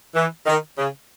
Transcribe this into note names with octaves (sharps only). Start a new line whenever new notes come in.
E3
D#3
C#3